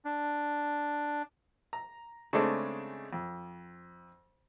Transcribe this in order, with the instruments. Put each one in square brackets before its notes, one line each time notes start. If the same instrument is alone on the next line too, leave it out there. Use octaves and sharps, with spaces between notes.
[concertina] D4
[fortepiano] A#5
C#3 G#3 A3 C4 D4 A4
F2